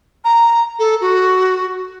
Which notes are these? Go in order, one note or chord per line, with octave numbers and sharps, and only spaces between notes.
A#5
A4
F#4